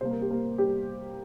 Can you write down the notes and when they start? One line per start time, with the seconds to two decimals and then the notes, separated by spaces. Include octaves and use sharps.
0.01 C3 G3 A#3 C5
0.11 A#4
0.22 G4
0.31 A#3 A#4
0.58 G3 G4